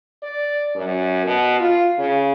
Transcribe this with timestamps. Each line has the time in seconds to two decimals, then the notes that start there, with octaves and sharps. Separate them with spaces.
0.23 D5
0.75 F#2
1.26 B2
1.60 F4
1.98 C#3